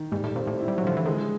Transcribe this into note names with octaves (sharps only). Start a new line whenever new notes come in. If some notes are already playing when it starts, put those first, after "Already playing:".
Already playing: D#3
G#2 G3
A2
A#2 C4
A2
E4
G3
F#3
D3 F3
E3
D#3 G#3